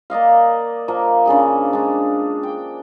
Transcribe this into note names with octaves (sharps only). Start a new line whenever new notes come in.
A#3 D5 D#5 F5
F3 A#3
C#3 D4 G#4 G#5
G#3 D4
G5